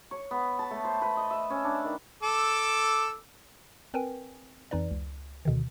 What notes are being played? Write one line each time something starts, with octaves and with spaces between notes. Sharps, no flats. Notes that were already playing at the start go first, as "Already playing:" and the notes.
C#5
B3
A5
A3
C5
B4
D#5
E5
C#4
D4
D#3
A4 D6 E6
C4 A#4 B4 G5 G#5
F2 E3 D#4 B4 D5
C#2
D2 B2 D3 D#3